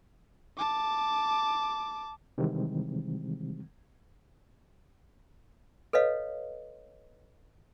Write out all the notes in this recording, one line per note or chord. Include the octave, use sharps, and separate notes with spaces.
A5 D6
C3 D#3 E3 G3 G#3 C4
A4 B4 C#5 D#5 F5